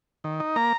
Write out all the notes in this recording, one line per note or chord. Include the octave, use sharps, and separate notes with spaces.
D#3
D#4
A#3 A#5